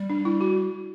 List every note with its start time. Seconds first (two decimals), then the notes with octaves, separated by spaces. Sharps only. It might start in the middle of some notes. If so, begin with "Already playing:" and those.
Already playing: G3
0.10 D4
0.25 E4
0.41 F#4